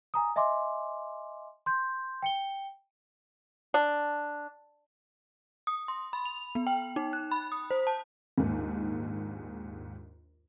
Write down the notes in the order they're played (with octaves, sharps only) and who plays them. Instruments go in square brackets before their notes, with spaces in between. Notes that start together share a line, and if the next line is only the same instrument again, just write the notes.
[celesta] G#5 A#5 D#6
D#5 E5 G#5 C6 D6
C6 G6
G5 C#7 G7
[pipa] D4
[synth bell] D#6
C6
B5
F7
B3
G5
D#4
F#6
B5
D#6
C5
A5
[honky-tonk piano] A#1 D#2 G#2